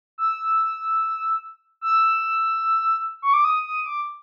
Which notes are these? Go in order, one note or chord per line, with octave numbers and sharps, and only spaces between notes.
E6
E6
C#6
D6
D#6
D#6
D6